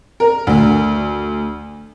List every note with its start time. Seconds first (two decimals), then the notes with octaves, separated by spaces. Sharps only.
0.20 A#4
0.47 D2